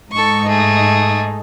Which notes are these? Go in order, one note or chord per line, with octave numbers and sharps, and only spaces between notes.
G#2 D#4 A4 C#6
A3 G#4